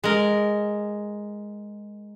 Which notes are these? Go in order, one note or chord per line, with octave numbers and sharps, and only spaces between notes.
G#3 A#4